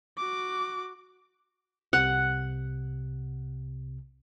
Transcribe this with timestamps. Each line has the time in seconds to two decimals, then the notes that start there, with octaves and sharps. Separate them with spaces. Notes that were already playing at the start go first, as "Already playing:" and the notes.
0.17 F#4 D6
1.93 C2 C3 F#5